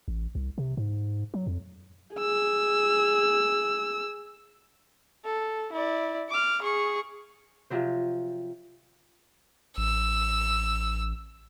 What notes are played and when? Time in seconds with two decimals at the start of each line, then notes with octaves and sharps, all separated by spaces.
0.08 A1
0.35 C2
0.58 C3
0.77 G#2
1.34 F#3
1.47 F2
2.16 G#4 E6
5.24 A4
5.73 E4 D5
6.30 D6 F6
6.62 G#4 C#6
7.70 C3 F3 F#3 C5
9.77 A1 E6